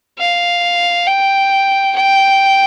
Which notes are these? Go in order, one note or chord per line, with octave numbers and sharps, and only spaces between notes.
F5
G5
G5